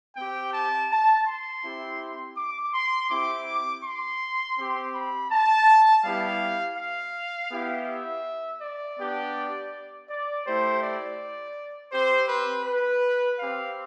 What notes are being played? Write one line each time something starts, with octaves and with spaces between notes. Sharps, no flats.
C4 G4 G5
A5
A5
C6
C4 E4 G4
D6
C6
C4 E4 G4 D6
C6
C4 G4
B5
A5
G3 B3 E4 G4 F5
F5
B3 E4 G4
E5
D5
B3 D4 G4
D5
A3 E4 G4 C5
D5
C4 G4 C5
B4
B4
C4 G4 F5